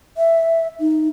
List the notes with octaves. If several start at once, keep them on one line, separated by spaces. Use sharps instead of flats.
E5
D#4